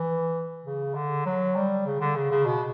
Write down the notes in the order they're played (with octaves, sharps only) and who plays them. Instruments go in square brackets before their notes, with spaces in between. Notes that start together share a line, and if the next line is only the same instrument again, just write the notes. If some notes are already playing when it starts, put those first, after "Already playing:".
Already playing: [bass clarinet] E3
C#3
D3
F#3
G3
C#3
D3
C#3
C#3
B2